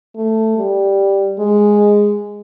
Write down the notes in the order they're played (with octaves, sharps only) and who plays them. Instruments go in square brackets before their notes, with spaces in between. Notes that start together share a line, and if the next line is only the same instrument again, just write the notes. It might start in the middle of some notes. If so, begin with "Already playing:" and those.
[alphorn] A3
G3
G#3